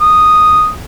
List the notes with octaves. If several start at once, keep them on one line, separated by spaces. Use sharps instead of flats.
D#6